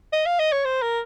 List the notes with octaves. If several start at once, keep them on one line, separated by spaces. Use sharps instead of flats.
D#5
F5
D#5
C#5
C5
A#4